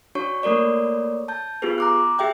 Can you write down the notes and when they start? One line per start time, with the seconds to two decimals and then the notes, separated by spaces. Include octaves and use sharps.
0.15 D4 F#4 C#5 C#6
0.43 A3 A#3 A#4 C#5 D5
1.28 A5 G6
1.62 B3 F4 G4 G#4 B4
1.78 A#5 D6 F#6
2.18 G4 G#4 E5 G5 F#6